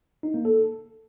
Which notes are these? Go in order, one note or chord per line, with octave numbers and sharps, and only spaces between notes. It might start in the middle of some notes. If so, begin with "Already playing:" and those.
D#4
A#3
A4